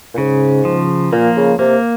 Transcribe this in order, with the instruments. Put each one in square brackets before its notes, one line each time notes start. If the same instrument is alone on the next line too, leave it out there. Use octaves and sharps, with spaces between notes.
[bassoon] A#2
[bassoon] G#2 [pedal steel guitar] C#3
[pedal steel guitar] F3
[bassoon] A#2 [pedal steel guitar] A#3
[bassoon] C#3
[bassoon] C3 [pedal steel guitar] A#3